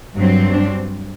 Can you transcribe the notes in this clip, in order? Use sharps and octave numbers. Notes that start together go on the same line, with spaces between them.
G2 F#3 C4
D4